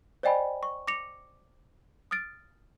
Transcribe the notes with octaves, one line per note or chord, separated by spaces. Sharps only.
C5 D5 D#5 G5 G#5 B5
C#6
D6 A#6 C#7 F7
D#6 F6 A6 D7